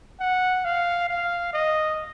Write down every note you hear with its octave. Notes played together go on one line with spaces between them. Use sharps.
F#5
F5
F5
D#5